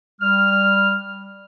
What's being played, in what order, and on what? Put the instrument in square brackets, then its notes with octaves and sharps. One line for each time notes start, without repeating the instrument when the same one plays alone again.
[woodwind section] G3 F6